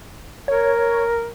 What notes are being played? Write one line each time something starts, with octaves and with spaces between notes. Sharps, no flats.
A#4 C#5